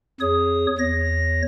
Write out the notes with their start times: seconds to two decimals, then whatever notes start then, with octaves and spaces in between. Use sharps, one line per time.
0.20 F2 G#4 C#5 D#6
0.78 E2 C#5 A#6